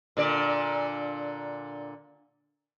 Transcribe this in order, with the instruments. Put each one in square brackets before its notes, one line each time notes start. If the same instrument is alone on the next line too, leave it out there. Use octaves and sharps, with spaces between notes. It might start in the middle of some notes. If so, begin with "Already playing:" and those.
[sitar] A#2 D3 D5